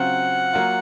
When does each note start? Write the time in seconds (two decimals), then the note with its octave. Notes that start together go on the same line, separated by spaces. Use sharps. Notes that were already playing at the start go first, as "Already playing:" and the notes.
Already playing: C#3 F#3 C4 F4 F#5
0.53 F#3 A#3 F4